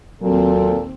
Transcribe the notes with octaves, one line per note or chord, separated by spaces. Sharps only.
D#2 A#2 F#3 C4 A4